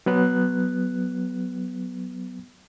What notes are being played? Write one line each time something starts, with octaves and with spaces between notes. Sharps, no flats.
F#3 B3 F#6